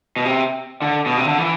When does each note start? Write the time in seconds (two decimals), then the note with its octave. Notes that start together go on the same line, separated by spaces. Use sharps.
0.16 B2
0.25 C3
0.82 D3
1.06 B2
1.17 C3
1.27 D3
1.38 E3